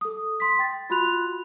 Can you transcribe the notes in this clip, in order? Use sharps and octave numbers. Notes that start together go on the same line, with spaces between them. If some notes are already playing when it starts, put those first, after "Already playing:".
A4 D#6
C6 B6
G5 A6
F4 F#4 B5 C6 F#6 F7